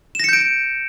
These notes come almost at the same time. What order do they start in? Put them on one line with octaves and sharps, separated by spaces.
E7 A#6 C#7 G6 D7